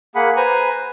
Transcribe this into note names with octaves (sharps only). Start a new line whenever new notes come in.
A#3 G#4 F#5 B5
B4 C5 G#5 A#5